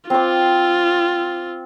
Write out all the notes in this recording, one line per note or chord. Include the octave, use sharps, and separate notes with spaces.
C4 F4 D6